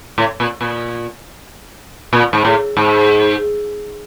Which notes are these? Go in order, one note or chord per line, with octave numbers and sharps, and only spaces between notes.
A2
A#2
A#2
A#2
G#2
A2
G#2